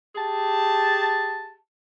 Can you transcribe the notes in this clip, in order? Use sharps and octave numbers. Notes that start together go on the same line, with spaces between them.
G4 G#4 A5